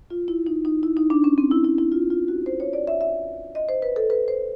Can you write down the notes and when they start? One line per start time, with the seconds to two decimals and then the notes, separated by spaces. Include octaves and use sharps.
0.10 F4
0.28 E4
0.47 D#4
0.65 D#4
0.83 E4
0.97 D#4
1.10 D4
1.24 C#4
1.38 C4
1.51 E4
1.65 E4
1.78 E4
1.92 F4
2.10 F4
2.28 F#4
2.46 C5
2.60 C#5
2.73 D5
2.87 E5
3.01 E5
3.55 D#5
3.69 C5
3.82 B4
3.96 A4
4.10 B4
4.28 C5